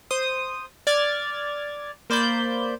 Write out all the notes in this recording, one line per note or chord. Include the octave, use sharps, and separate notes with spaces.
C5 D#6
D5 F6 G#6 A6
A#3 C5 D5 B5 G6